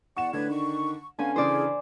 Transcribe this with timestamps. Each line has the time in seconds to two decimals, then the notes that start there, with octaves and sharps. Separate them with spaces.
0.17 E2 D5 F#5 C#6 E7
0.33 A2 D3 D4 B4 G#6
0.50 D#3 C#6
1.19 D3 B3 C#4 F5 G#5
1.36 C#3 E3 G#4 C5 D5